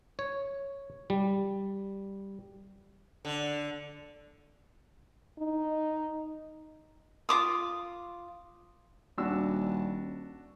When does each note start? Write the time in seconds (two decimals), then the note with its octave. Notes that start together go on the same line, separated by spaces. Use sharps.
0.19 C#5
1.10 G3
3.25 D3
5.38 D#4
7.29 F4 B4 D6 D#6
9.18 D#1 D4 F#4 E6